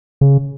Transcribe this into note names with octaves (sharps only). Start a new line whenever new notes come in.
C#3